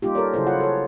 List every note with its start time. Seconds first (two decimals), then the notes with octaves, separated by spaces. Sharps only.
0.02 G3 A#3 D#4 F4 G4
0.15 A4 A#4 C#5 D5
0.33 C#3 F#3 E4 G#4 A4 C5
0.47 F4 C#5 F#5
0.60 A4 C#5